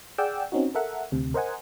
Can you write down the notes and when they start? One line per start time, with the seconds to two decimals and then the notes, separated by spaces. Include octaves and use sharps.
0.18 G#4 D5 F#5 G5 E6
0.52 C4 C#4 D#4 F#4
0.75 A4 A#4 E5 F#5
1.12 D2 C3
1.34 A#4 C5 D#5 F#5 G#5